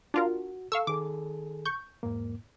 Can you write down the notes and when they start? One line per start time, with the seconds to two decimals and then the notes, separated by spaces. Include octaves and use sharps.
0.14 D4 F4 F#4 A#4
0.72 A4 F5 C#6 E6
0.87 D#3 G#4 A4 D6
1.65 C#6 G6
2.03 E2 G#2 A#3